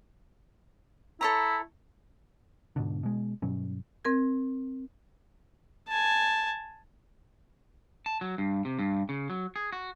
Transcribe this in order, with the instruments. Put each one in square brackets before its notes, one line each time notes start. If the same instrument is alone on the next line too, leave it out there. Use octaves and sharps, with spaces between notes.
[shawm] E4 [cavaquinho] A4 C#5 A#5
[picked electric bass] E1 G#2 B2 D3
B2 G#3
G2 B2 F#3 C#4
[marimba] C4 A#4 G#6
[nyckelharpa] G#5 A5
[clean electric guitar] A5
F#3
G2
C3
G2
C#3
F#3
G#4
F#4